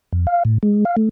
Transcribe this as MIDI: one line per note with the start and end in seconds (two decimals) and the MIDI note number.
0.12 0.26 41
0.27 0.43 77
0.45 0.58 45
0.63 0.84 56
0.85 0.96 77
0.97 1.09 57